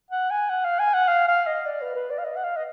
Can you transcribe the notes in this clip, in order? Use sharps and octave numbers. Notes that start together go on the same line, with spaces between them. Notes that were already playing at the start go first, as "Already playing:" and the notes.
F#5
G#5
F#5
F5
G#5
F#5
F5
F5
D#5
D5
B4
B4
D5
F5
D#5
F#5
F5
D#5